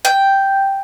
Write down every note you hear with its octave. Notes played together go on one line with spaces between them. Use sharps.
G5